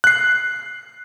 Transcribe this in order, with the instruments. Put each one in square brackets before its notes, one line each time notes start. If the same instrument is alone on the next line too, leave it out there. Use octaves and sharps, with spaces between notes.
[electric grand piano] F#6 C7